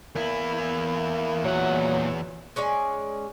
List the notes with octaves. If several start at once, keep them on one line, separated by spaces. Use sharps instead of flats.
E2 A#3 E4
A#2 F#3 F#5
G#3 C#4 G#4 D5